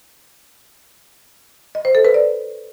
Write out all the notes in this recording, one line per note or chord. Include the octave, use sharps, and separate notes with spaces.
D#5
C5
A4
B4
D5